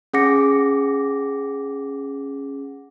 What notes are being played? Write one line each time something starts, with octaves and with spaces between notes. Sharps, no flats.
C#4 G#4 F#5 D6 A#6 C#7